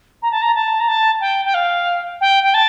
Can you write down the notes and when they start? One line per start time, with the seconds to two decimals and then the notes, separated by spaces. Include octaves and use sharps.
0.22 A#5
0.31 A5
0.41 A#5
0.55 A5
0.79 A#5
0.88 A5
1.20 G5
1.45 G5
1.54 F5
2.20 G5
2.43 G5
2.54 A5